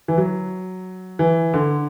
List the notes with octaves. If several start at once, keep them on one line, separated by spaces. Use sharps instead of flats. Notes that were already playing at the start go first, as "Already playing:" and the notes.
E3
F#3
E3
D3